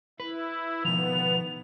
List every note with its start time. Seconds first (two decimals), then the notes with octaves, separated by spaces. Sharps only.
0.20 E4 B4
0.85 B2 D#3 F3 B3 F7